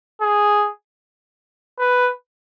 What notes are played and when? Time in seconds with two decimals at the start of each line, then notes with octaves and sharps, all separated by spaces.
0.21 G#4
1.79 B4